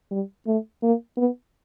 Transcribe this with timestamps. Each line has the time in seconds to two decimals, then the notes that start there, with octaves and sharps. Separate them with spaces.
0.11 G3
0.47 A3
0.83 A#3
1.17 B3